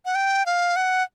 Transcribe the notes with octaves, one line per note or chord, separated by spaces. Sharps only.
F#5
G5
F5
F#5